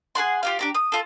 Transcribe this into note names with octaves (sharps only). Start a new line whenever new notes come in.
G#4 A4 F#5 C6
F4 G4 F5
D4 G4 A#5
D#6
F4 A4